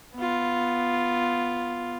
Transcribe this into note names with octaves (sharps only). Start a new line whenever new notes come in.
B3 F4